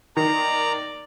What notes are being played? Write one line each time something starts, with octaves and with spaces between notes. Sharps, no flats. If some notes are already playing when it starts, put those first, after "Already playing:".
D#3 D5 A#5